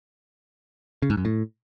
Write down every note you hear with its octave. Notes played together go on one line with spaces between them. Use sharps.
C#3
G#2
F#2
A2